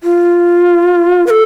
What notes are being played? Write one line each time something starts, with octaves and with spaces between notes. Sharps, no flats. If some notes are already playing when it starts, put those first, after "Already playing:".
F4
B4
A4